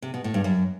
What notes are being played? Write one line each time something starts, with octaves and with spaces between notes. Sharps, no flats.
C3
B2
A2
G2
F#2